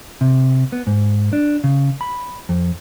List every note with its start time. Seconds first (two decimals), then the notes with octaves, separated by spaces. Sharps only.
0.21 C3
0.72 B3
0.87 G#2
1.33 D4
1.64 C#3
2.01 B5
2.49 F2